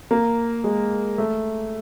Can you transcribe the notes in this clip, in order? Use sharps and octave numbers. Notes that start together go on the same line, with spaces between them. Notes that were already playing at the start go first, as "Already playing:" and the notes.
A#3
G#3
A3